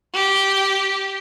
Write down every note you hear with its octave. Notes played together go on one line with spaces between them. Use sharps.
G4